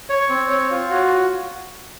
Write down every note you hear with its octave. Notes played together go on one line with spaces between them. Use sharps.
C#5
C4
C#5
F4
F#4